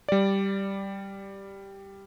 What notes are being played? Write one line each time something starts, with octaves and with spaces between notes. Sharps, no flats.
G3 D5